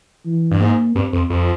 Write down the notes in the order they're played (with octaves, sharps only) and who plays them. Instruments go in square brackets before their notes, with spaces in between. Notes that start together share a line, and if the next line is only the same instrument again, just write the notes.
[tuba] E3
[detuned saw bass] G2
[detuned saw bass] G#2 [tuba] A#3
[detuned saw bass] G2 [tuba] C4
[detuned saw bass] F2
F2